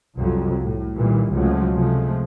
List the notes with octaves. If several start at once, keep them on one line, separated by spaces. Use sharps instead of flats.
C2 F2 F#3
A2
A#2 D#3 E3 G3
C#2 C3 F3 F#3 G#3 A3
C3 F3 G#3 A3